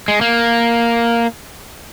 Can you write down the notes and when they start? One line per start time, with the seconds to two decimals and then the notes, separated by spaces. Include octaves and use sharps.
0.08 G#3
0.21 A#3